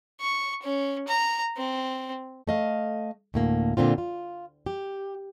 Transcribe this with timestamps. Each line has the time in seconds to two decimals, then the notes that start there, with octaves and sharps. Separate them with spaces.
0.21 C#6
0.63 C#4
1.08 A#5
1.57 C4
2.47 A3 D#5 F5
3.34 D2 A2 A#3
3.77 A#2 D3 C4 F4
3.98 F4
4.66 G4